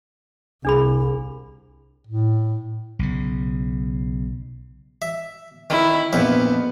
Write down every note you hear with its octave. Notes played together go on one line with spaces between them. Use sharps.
C2 D4 G#4 B5
A2
B1 C#3
E5
D#3 E4
A#1 F2 B3 E5